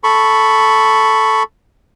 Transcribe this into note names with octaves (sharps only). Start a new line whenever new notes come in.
A4 B5 C#6